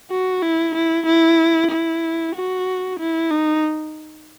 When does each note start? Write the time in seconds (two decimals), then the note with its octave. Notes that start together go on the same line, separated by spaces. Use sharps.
0.11 F#4
0.42 E4
0.75 E4
1.06 E4
1.71 E4
2.35 F#4
2.99 E4
3.31 D#4